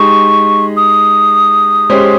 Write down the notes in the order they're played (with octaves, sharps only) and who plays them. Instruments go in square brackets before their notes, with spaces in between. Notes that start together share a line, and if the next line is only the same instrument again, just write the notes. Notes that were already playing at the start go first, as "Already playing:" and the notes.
Already playing: [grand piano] G#3 D#4 G4 [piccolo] C#6
[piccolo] D#6
[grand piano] G#3 C#4 G4 C5